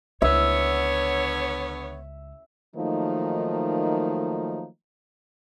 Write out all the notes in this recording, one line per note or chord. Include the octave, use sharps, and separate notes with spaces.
C#2 D3 B3 C#5 E5
D#3 F3 F#3 A3 A#3 D#4